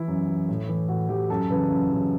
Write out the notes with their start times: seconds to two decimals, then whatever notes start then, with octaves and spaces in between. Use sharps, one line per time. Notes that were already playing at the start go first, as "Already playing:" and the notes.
Already playing: E3 E4
0.08 F#2
0.28 E3
0.49 A2
0.69 E3
0.88 A2 F#4
1.09 E3 G4
1.30 F#2 A4
1.50 C#3 E3 B4
1.69 F#2
1.90 C#3 E3